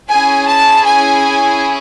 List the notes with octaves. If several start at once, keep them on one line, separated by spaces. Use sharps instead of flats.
C#4 E4 G#4 G#5
A5
G#5